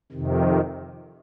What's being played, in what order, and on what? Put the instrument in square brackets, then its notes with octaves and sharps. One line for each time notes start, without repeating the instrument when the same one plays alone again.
[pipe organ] F2 C3 D#3